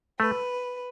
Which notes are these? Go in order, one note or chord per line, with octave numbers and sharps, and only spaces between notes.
A3 B4